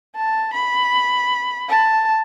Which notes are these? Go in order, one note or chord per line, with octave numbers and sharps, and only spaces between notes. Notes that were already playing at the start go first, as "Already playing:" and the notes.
A5
B5
A5